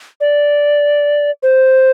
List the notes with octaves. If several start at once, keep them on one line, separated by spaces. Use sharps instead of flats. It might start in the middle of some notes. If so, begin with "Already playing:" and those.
D5
C5